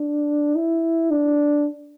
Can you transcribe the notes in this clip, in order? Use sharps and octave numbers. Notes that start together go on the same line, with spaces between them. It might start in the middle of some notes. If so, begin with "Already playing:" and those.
Already playing: D4
E4
D4